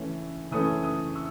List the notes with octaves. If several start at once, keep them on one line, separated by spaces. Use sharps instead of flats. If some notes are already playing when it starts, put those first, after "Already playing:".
Already playing: E3 A3 C#4
E3 A3 C#4 D#6
D#6
E6